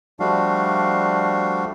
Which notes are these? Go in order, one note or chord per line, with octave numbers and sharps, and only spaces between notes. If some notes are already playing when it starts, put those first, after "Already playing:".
F3 G3 A3 D4 F#4 F5